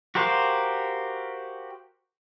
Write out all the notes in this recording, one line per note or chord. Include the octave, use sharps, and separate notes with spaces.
F#4 G4 A#4 C5 F5